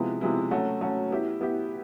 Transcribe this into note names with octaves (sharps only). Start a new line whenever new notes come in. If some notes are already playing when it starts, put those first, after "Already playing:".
Already playing: C3 F3 G#3 B3 E4
C3 F3 G#3 B3 E4
F#3 A3 C#4 F#4
F#3 A3 C#4 F#4
B3 E4 G4
B3 E4 G4